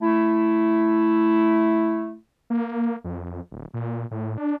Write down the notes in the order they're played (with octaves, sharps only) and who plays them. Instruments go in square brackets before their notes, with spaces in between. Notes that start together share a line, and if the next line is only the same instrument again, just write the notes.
[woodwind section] A3 E4
[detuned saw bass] A#3
F2
D1
A#2
A2
D4